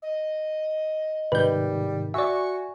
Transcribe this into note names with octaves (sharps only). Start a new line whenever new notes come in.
D#5
G#2 C3 D#3 G3 B4 G6
F#4 D5 E5 G#5 C#6